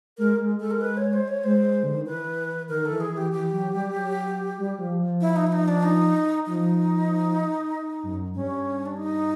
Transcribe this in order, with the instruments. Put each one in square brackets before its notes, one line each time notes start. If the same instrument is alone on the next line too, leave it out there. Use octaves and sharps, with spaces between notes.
[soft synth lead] G#3 [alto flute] A#4
[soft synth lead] G#3
[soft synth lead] G#3 [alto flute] A4
[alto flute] A#4
B4
C#5
C5
C#5
[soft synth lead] G#3 [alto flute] C5
[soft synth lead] D3
D#3
[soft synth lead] E3 [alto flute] B4
[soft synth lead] D#3 [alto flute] A#4
[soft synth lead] E3 [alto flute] A4
[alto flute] G#4
[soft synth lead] E3
[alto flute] G4
[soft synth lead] E3 [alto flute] G4
[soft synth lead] F#3
G3
F#3
G3
F3
F3
[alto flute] E4
D#4
E4
D#4
D4
D#4
[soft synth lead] F3 [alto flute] D#4
[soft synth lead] F#2
[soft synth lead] G2 [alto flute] C#4
[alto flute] D4
D#4